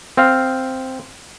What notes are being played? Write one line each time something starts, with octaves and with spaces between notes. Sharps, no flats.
C4 F5